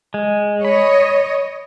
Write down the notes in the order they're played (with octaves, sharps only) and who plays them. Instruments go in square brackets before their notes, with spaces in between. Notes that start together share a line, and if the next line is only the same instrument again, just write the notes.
[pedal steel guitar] G#3
[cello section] C#5 D#5 [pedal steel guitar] B5